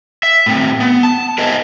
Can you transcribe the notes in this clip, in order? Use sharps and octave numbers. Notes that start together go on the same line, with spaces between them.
E5
A2 C4
B3
A5
A#4 C5 D#5 E5 G#5